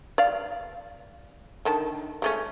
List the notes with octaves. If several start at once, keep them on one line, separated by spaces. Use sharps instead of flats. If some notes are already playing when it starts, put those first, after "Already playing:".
D5 F5
D3 D#3 A5
G#3 A3 C#4